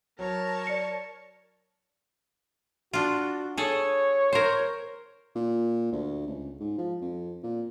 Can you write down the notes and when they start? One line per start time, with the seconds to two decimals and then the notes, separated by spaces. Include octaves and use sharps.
0.19 F#3 A#4 C#5 A5
0.67 D5 C#7
2.93 D4 F4 F#4
3.57 G#4 A4 C#5
4.33 A#4 C5
5.35 A#2
5.92 D2
6.27 C#2
6.60 G#2
6.78 F3
7.02 F2
7.43 A#2